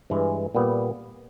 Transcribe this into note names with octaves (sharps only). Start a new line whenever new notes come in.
G2 E3 G#3
A#2 G3 B3